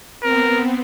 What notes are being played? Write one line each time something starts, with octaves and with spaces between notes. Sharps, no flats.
B3 C4 A#4